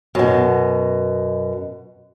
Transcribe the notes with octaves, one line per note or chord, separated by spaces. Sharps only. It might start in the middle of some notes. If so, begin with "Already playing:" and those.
F#2 B2